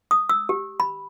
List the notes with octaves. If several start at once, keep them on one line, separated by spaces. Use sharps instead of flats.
D#6
E6
G4
B5